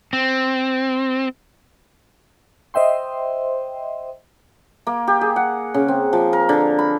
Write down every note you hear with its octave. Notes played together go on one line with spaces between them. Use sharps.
C4
C5 D#5 E5 G5 C6
A#3
G4
G#4
F#5
C#3
C4
F3
A#4
D3
B5